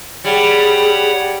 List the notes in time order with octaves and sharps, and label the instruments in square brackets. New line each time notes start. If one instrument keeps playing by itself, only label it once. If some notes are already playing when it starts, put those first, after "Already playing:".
[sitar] G3 [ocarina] G#4 [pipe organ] C#5 F#5 B5